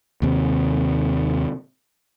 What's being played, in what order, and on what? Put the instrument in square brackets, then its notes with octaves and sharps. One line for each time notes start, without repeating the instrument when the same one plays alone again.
[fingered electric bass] D#2 C3